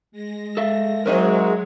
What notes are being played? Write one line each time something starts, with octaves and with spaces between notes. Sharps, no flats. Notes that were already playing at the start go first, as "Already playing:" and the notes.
G#3 A#6
A4 E5 F5
G#2 F#3 G#3 C4 A#4 D#5 E5